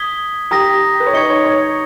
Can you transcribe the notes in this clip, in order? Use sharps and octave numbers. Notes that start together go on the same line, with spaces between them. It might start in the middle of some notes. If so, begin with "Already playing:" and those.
Already playing: D#6 G#6 B6 G7
G4 G5 A#5 D#6 A#6
B4
C#5
D#4 D#5 C#6 G#6 C#7 G7
C#5
C#5